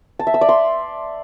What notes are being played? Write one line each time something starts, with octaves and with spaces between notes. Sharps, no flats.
A5
E5
E6
D5
C6